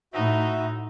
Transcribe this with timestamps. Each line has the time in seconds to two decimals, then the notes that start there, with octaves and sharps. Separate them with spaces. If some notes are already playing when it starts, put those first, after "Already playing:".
0.13 A2 D#4 F#4 E5